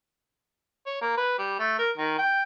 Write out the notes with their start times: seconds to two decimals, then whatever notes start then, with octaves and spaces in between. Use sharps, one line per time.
0.86 C#5
1.01 A#3
1.17 B4
1.38 G3
1.59 A3
1.78 A#4
1.98 D#3
2.18 G5